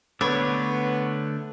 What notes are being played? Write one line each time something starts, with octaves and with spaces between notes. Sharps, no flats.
D3 A3 B3 D4 C#5 B5